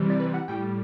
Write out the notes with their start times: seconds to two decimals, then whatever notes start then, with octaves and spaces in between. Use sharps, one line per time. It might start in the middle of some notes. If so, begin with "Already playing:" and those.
Already playing: C3 E3 G3
0.10 D5
0.20 B4
0.34 F#5
0.48 A2 G3 G5